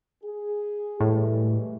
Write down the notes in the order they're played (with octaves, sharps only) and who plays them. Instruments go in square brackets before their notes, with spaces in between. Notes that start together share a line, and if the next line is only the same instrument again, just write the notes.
[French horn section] G#4
[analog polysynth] A2 [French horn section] E3 G3 G#3